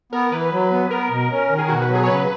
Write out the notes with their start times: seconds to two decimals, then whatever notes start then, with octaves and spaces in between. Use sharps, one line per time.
0.12 B3 A#4
0.31 E3 B4
0.52 F#3
0.71 B3
0.90 B3 A#4
1.10 B2
1.30 C#4
1.50 D#3
1.58 G#4
1.68 B2 F#4
1.82 B4
1.89 F#3
1.95 G#4
2.03 C#5
2.08 C#3 B4